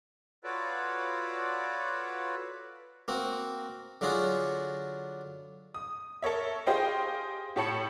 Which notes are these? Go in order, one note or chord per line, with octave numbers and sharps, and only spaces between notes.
F4 F#4 A4 B4 C#5 D5
A#3 C4 F#4
D3 F#3 D4 F4 F#4 G#4
D#6
A4 A#4 C#5 E5
G4 G#4 C5 D#5 F5 G5
A2 G4 C#5 A5 B5 C#7